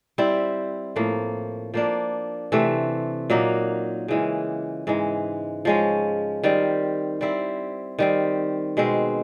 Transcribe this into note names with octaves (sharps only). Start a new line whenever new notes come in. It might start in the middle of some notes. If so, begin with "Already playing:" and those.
G3 C4 E4
A2 F3 A#3
F3 A#3 D4
C3 E3 A3 C4
A#2 F#3 A#3 D#4
C#3 E3 G#3
G#2 E3 G#3
F3 G#3 C#4
D#3 G3 C4
G3 C4 E4
D#3 G3 C4
B2 G#3 C4